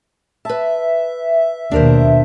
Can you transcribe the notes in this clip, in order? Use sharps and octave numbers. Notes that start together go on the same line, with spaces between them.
B4 E5 A5
D#2 B2 D4 A#4 C5